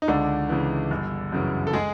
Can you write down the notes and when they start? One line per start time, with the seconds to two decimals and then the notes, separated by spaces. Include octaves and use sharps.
0.02 D#4
0.08 C#2 D3 D4
0.49 C#3 E3
0.91 G1
1.32 F#2 C#3 E3
1.67 A4
1.73 G#3 G#4